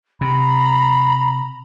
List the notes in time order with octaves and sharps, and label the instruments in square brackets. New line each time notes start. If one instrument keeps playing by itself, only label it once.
[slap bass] C3 [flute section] A#5 B5